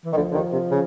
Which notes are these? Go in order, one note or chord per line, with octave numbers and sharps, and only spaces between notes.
E3
D#3
D2 D3 F3
D3
D#2 D#3
C3
C#3